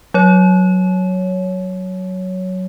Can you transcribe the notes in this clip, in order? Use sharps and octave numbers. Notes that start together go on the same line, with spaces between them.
F#3 C#5